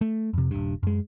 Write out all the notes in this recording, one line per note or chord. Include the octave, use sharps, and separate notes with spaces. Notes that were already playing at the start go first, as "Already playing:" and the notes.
A3
F2 C3
D#1 G2
F#2 G#3